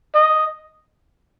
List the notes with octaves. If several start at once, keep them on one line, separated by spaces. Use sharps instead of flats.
D#5